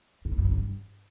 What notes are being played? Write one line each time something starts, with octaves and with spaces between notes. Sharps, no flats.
F#2
E2
F#2
D#3
G2